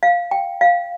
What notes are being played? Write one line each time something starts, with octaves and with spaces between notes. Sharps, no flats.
F5
G5
F5